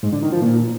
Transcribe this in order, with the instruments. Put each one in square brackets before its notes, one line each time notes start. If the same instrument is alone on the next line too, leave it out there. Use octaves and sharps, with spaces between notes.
[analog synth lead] G#2
D3
D#3
F3
A#2